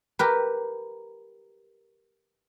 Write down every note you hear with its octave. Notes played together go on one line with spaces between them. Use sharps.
G4 A#4 B4